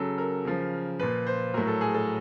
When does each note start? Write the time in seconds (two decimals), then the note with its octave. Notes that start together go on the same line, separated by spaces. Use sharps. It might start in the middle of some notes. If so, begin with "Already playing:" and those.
Already playing: C#3 F#3 A4
0.18 A#4
0.45 C#3 F3
0.99 A#2 F3 B4
1.27 C5
1.54 A2 F#3 A#4
1.67 A4
1.81 G#4
1.94 A4